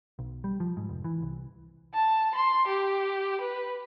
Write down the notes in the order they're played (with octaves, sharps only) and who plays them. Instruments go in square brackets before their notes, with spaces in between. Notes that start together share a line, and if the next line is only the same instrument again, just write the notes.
[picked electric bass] B1
G3
F3
G#2
F1
E3
C2
[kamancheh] A5
C6
G4
B4